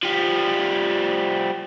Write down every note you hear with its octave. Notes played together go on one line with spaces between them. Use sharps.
F3 G3